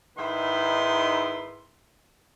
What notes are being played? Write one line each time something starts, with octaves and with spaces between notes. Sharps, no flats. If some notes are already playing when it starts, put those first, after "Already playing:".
G#2 D#3 E4 B4 C6